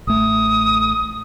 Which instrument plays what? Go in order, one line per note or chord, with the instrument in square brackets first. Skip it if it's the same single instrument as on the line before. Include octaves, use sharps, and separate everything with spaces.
[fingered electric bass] A1 A3 [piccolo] D#6